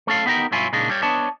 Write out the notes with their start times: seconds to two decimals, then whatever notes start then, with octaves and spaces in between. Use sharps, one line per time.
0.07 A3 C#4 A4 F5
0.26 B3 D#4 G4 G#4 A#4
0.51 B1 G2 F#3 E4 F4 G#5
0.73 A#2 C#3 G#3 A#3 D4 D#4
0.89 G3 C#5
1.03 B3 D4 C#5 D#5 A5